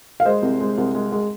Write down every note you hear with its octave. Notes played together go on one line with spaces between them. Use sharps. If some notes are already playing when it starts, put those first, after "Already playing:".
F5
G#3 C5 D#5
C2
G#3
C2
G#3
G#3